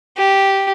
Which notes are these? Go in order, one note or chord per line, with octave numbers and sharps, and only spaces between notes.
G4